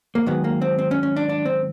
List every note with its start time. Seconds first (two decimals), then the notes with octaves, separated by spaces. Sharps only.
0.15 A#3
0.26 G#2 D#3 F#3 B3
0.44 A#3
0.61 C4
0.79 C4
0.91 C#4
1.03 C#4
1.16 D4
1.29 D4
1.45 C4